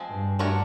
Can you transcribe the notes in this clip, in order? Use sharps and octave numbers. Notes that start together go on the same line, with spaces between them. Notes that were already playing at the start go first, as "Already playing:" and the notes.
Already playing: F3 G#3 C4
G2
A3 D4 F#4 A#4 C#5